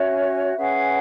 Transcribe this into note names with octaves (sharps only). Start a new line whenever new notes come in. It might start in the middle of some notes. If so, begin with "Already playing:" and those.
Already playing: C#4 F#4 C#5 E5
C#4 G#4 B4 F#5